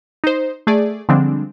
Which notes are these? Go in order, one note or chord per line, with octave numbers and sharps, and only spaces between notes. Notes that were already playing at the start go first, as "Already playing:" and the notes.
D#4 C5
A3 G#4 D5
D3 F3 G3 G#3 C4 D4